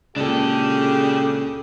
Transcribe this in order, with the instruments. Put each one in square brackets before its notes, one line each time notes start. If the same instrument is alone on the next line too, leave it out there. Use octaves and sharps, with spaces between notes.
[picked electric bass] C#2 A#2 [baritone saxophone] C#3 [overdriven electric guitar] D4 A4 [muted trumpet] G4